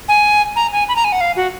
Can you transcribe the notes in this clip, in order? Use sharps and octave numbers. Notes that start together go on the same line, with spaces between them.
G#5
A#5
G#5
B5
A#5
G#5
F#5
F5
F#4